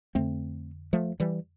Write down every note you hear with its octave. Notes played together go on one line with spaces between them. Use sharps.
F2 D3 A3 C4
F3 A3
E3 G3